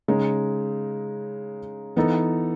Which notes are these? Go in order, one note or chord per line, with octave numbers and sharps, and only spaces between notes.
C#3 G#3 D#4
E3 B3 D#4 A4